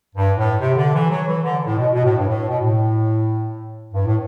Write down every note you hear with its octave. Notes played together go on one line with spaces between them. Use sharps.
G2
A2
C3
D3
E3
F#3
E3
D3
A2
B2
B2
A2
G2
A2
B2
A2
G2
A2